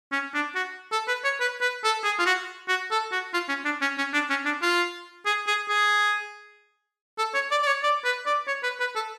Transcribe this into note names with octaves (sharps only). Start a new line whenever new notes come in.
C#4
D4
F#4
A4
B4
C#5
B4
B4
A4
G#4
F4
F#4
F#4
A4
F#4
F4
C#4
D4
C#4
C#4
D4
C#4
D4
F4
G#4
G#4
G#4
A4
C#5
D5
D5
C#5
D5
B4
D5
C#5
B4
B4
A4